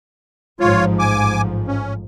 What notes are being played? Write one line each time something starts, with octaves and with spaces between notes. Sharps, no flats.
A1 G#2 F3 F4 C#5
G#5 D6
C#4